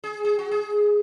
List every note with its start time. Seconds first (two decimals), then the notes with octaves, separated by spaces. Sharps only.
0.04 G#4
0.25 G#4
0.39 F#4
0.51 G#4